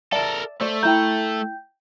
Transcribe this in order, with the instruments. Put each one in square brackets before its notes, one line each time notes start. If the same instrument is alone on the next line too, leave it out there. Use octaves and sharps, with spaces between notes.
[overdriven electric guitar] A4 A#4 [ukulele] D5 E5 A5
[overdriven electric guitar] A3 [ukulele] C5 D5
[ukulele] E4 A#5 [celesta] G5 G6